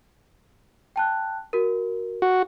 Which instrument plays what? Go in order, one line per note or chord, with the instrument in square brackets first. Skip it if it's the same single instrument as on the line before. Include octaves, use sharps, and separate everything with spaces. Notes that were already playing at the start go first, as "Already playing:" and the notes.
[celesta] G5 A5 F#6
F#4 A#4
[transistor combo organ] F#4